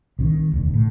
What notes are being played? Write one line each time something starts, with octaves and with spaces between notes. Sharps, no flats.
C2 D3 D#3
E1 D2
A2